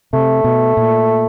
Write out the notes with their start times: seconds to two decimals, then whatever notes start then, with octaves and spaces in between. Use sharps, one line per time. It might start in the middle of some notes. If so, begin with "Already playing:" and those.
0.13 C3 A3
0.44 B2
0.77 A#2